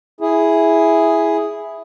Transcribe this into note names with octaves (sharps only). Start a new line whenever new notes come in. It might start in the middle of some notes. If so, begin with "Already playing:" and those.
E4 G#4